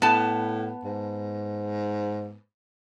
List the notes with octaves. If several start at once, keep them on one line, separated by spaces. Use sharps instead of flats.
A2 B3 A5
G#2